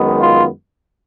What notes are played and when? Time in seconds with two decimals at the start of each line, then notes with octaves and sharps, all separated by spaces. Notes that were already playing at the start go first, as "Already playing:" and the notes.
Already playing: F#2 D#3 G#3 B3
0.20 F4